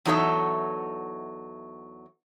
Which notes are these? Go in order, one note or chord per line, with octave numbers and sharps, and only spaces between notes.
E2 F#3 D#4 A4 C#5 E5